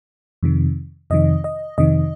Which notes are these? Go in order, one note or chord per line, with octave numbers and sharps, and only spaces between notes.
F2 C3 D#3
F2 C3 D#3 D#5
D#5
F2 C3 D#3 D#5